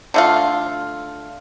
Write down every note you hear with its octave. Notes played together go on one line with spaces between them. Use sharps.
D3 A3 F4